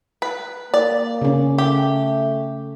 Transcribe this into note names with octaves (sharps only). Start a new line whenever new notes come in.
B4
A#3 D5
C#3 C#4
A3 G4